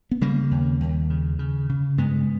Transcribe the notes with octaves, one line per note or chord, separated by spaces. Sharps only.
B3
C#3 G3 A#3
D#2
D#2
C#3
C#3
C#3
G2 G#3 B3